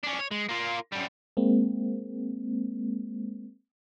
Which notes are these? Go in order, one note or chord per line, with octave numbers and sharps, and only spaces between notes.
C#4 D4
C#5
G#3
A#3 F4
F#2 G3
G#3 A#3 C4